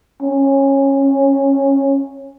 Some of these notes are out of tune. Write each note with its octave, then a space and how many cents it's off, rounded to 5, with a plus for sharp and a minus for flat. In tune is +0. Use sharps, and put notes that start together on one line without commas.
C#4 -20